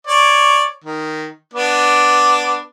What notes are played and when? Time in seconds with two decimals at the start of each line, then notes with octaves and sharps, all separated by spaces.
0.07 C#5 D5
0.84 D#3
1.54 B3 D4 D6